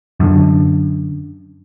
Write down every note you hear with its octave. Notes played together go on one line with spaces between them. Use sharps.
F#2 D3